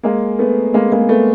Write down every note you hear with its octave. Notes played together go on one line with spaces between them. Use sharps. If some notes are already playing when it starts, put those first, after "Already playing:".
G#3 A#3
A3 B3
G#3 A#3
G#3 A#3
A3 B3